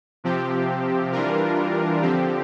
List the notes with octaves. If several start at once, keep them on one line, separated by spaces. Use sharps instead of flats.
C3 F3 C4 G4
E3 G3 D4 F4 A#4
D3 F3 C4 G4